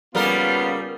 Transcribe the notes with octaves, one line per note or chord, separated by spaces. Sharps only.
C#3 G3 A#3 B3 F4 A#4